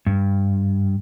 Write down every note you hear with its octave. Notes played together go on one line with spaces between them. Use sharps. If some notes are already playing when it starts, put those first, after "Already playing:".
G2